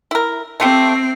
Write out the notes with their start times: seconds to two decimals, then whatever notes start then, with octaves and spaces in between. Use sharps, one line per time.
0.11 E4 A#4
0.60 A3 C4 F4 G4